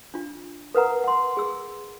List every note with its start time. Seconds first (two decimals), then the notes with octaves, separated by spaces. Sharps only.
0.14 D4 F4
0.75 A#4 B4 F#5 A#5
1.04 F#5 C6
1.37 G#4 E6